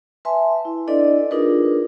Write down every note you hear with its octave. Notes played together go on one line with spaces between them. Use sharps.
B4 E5 G#5 A5 C6
E4
D4 E4 A4 B4 D5 D#5
D4 D#4 F4 G#4 A#4 B4